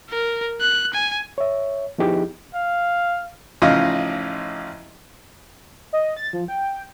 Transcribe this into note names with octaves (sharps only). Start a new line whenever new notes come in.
A#4
F#6
G#5
C#5 E5
F3 B3 D#4 E4 G4 G#4
F5
A1 C#3 F3 D#4 F4 D#5
D#5
A6
F3
G5